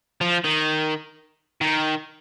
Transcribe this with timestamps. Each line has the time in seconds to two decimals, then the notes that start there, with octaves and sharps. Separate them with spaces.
0.21 F3
0.44 D#3
1.61 D#3